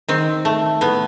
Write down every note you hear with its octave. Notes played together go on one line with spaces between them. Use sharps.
D#3 C4
A3
A2 B3